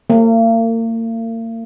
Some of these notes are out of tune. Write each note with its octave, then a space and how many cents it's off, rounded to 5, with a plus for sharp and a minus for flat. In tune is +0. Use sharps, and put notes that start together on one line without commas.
A#3 -40